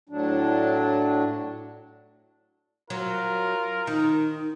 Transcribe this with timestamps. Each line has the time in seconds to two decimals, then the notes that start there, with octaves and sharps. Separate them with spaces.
0.09 A2 F#3 D4
2.90 F#3 F4 A#4
3.87 D#3 D#4